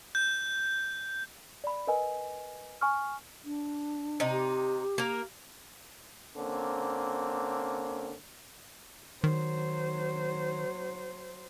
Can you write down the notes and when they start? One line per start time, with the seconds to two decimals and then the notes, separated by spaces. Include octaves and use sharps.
0.15 G6
1.64 D5 B5
1.87 A#4 B4 D#5 G#5
2.81 G#5 C#6 F6
3.44 D4
4.20 C3 D#4
4.31 G4
4.98 A#3 A#4
6.36 D3 A#3 C4 C#4
9.24 D#3 F#3 C5